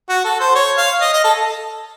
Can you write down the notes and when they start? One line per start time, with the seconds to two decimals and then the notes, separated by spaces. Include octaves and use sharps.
0.09 F#4
0.24 A4
0.40 C5
0.55 C#5
0.78 F5
1.01 D#5
1.13 D#5
1.24 A4